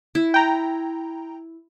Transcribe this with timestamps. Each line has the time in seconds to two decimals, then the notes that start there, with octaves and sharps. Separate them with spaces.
0.15 E4
0.34 G5 A#5